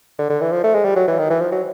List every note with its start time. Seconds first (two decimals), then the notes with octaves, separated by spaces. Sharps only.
0.19 D3
0.30 D3
0.41 E3
0.52 F3
0.64 A3
0.74 G#3
0.85 G3
0.96 F#3
1.07 E3
1.18 D#3
1.30 E3
1.40 F3
1.52 F#3